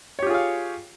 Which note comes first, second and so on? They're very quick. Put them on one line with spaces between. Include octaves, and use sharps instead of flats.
C#5 G4 F4 G#4 F5